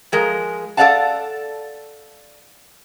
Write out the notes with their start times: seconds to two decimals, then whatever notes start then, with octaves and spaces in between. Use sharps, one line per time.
0.12 F3 G#3 A#4
0.77 A4 B4 D5 F5 F#5 A5